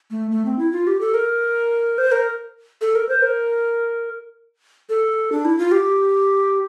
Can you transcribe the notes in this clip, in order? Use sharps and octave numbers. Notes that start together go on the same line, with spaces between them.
A3
A3
C4
E4
F4
G4
A4
A#4
C5
A#4
A4
A#4
C5
A#4
A4
D4
E4
F4
G4